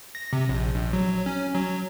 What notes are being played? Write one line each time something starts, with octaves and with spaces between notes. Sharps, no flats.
A#6
C3
A#1
A#1
F#3
C#4
F#3